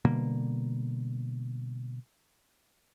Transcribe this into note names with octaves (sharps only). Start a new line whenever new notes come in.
B2 D3 G3 A#3